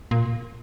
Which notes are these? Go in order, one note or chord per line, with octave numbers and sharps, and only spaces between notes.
A#2